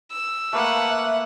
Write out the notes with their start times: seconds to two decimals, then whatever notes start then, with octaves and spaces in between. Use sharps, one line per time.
0.12 E6
0.53 A3 A#3 B4 F#5 A5
0.88 E5